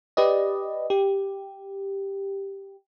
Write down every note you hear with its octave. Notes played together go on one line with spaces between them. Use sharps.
G4 B4 D5 D#5
G4